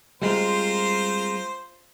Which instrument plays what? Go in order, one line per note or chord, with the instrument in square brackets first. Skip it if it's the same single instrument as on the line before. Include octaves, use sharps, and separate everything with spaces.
[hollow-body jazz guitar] G3 G#3 C4 [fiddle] F4 A#4 [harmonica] C5